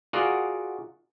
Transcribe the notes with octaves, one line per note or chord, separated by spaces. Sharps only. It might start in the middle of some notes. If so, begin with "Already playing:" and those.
F4 F#4 G#4 A#4 D5 F#5